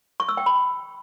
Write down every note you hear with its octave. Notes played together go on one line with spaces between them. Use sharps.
C#6
E6
G5
B5